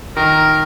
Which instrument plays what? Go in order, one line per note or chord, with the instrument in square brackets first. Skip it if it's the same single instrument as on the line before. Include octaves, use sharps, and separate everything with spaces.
[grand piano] D#3 [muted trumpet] A#4